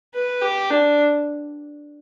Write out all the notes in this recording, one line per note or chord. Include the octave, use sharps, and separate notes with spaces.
B4
G4
D4